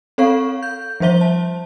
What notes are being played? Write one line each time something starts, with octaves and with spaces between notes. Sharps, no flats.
C4 A4 C#5 F5 C#6
G6
F3 G3 C5 E5 G7
A5